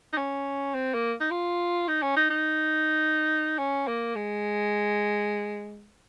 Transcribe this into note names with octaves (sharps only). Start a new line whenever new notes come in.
D#4
C#4
C4
A#3
D#4
F4
D#4
C#4
D#4
D#4
C#4
A#3
G#3